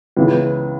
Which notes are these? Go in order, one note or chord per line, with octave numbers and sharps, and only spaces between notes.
C#2 C#3 E3 B3